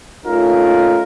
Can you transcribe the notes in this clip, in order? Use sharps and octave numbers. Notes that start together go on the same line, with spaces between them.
A3 C#4 D#4 F4 A#4